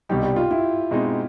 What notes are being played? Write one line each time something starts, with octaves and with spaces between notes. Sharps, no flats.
C2 B2 G3 C4 D#4 G4
G4
F4
E4
B2 G#3 C4 D#4